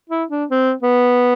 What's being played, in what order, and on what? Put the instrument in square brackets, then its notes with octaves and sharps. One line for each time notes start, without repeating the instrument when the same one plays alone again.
[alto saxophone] E4
D4
C4
B3